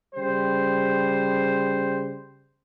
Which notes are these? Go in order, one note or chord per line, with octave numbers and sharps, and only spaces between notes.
C#3 G3 C5